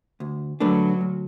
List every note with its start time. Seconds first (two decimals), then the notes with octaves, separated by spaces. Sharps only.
0.20 D2
0.60 D3 F#3 A3 D4 B4
1.01 D2